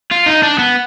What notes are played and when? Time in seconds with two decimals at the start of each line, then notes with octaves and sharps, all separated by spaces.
0.11 F4
0.26 D#4
0.43 D4
0.58 B3